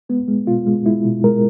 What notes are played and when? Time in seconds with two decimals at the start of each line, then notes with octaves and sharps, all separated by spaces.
0.09 G#3 B3
0.28 G#3
0.47 B2 F4
0.67 G#3
0.86 G#3 E4
1.05 B2
1.24 G#3 A#4